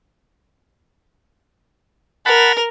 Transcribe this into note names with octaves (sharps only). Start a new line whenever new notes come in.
A#4 F#5 A5 B5